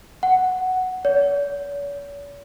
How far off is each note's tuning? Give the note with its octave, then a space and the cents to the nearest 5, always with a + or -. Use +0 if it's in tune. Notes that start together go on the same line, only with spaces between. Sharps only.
F#5 +0
C#5 +45